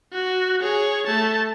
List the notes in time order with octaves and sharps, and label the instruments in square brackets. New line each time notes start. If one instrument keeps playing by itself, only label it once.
[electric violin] F#4
G#4 C#5
A3 A5